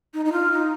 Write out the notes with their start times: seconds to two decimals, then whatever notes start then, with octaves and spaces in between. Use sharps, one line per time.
0.14 D#4
0.25 D#4
0.32 F4
0.52 D#4